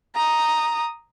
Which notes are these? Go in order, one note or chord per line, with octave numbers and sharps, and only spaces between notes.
A#5 D#6